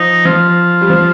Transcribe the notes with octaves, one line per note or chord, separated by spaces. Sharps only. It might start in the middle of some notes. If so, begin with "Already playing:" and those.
Already playing: F3 D#4
F3 F4
G3
F3